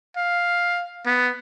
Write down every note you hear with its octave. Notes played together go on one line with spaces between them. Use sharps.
F5
B3